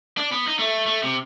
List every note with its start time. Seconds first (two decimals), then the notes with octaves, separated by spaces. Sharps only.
0.17 D4
0.32 B3
0.47 D#4
0.59 A3
0.86 A3
1.03 C3